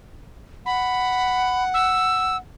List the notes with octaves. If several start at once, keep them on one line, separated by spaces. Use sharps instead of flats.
F#5 B5
E6